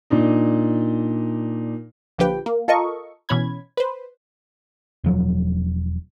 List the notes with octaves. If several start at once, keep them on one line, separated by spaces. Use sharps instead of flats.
A#2 D4 D#4
A#1 D3 F3 G4 B4 G5
A#3
F4 A4 A#4 D#5 C#6
B2 E3 C#4 B5 G#6
B4 C5
E1 F3 F#3